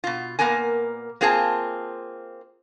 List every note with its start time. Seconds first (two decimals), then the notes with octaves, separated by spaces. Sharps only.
0.04 B2 F4
0.39 A#2 A#3 B3 A#4 G#5
1.21 A#3 C4 F4 G#4 G#5 A5